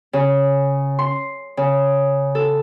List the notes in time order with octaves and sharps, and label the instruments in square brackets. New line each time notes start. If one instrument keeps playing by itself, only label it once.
[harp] C#3
C6
C#3
A4